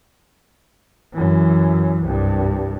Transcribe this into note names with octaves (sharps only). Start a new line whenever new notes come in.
F#2 E3
C2 G2